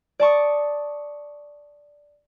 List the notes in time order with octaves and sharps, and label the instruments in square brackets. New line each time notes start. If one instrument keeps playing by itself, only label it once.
[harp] D5 A5 C#6 D#6